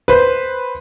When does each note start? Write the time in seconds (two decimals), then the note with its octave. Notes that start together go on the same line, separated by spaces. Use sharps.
0.08 B4 C5